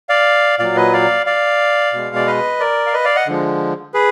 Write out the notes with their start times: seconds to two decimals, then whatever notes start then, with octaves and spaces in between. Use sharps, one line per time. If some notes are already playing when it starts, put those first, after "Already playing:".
0.09 D5 F5
0.59 A#2 F#3 D5 F5
0.76 B4 D#5
0.93 D5 F5
1.26 D5 F5
1.93 B2 G#3
2.16 D5
2.27 B4 D#5
2.60 A#4 D5
2.87 F5
2.93 B4 D#5
3.05 D5 F5
3.16 D#5 F#5
3.27 D3 F3 G#3
3.94 G#4 B4